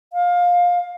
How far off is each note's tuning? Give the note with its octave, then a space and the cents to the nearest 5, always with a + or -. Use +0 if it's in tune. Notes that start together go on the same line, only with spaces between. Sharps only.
F5 +20